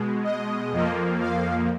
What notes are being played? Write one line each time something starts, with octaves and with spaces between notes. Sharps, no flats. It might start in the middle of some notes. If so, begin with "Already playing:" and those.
Already playing: B2 G#3
D#5
F2 F3 A#3
F5